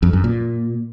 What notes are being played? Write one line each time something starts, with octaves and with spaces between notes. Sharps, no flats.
F2
F#2
A#2